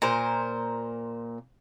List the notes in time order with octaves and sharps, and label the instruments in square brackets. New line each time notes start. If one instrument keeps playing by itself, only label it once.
[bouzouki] A#2 A#4 C5